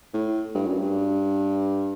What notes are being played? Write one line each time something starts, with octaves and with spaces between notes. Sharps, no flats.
A2
G2
F#2
G2